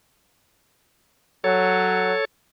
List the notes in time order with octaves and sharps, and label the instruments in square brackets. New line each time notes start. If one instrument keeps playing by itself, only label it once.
[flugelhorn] F#3 [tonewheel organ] A4 C#5